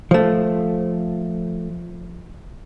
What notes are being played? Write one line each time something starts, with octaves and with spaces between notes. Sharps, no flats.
F3 A3